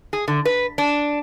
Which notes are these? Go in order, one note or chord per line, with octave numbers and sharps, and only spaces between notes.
G#4
D3
B4
D4